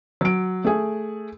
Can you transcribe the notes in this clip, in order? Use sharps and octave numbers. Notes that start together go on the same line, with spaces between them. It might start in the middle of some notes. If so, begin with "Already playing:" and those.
F#3 D7
A3 G#4